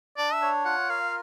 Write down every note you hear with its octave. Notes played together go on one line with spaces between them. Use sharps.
D4 D5
E5
C#5
F4 F#5
A#4 F5